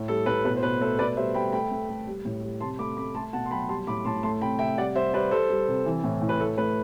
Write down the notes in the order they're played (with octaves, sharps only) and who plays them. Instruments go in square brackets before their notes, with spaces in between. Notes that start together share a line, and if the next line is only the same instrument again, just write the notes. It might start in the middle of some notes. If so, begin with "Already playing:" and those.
Already playing: [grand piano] A2
G3 A4
A2 B4
B2 B4
C5
B2 B4
A3 A4 C5
B2 B4 D5
G3 C5 E5
G3 G5 B5
A3 G5 B5
A3
A3
G3
A2
G3
C3 A5 C6
A3 B5 D6
A3 B5 D6
A3 A5 C6
B2 F#5 A5
C6
F#3 G5 B5
G3 A5 C6
A2 B5 D6
A2 A5 C6
A3 A5 C6
C3 G5 B5
C3 E5 G5
G3 D5 F#5
G3 C5 E5
G3 B4 D5
G3 A4 C5
G3
C3
E3
A2
A2
B4
A3 A4
A3 B4